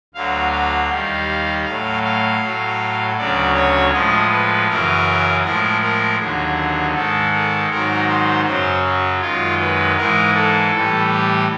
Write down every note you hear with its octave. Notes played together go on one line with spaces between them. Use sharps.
D2 D3 F#3 F5
F5
D#2 D#3 G3
A2 F5
F#3
F5
A2 F#3
D2 C#3 F#3 D5
C#5
A2 F3 G#3 D#5
B4
F#2 C#3 E3 A#4
A2 F3 G#3 A#4
A#4
D#2 D3 F#3 G#4
G#2 D#3 G#3 A4
A4
G#2 D#3 F#3 A#4
C5
F#2 C#3 F#3 C5
F#4
F#2 D#3 G#3 F4
B4
G#2 E3 G#3 A#4
A4
A2 E3 G3
G4